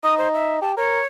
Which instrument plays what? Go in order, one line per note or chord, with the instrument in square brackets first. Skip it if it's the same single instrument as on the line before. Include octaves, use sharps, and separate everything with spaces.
[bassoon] D#4 [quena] D#6
[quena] C5
E5
[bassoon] G4 [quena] A5
[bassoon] A#4 [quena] C#5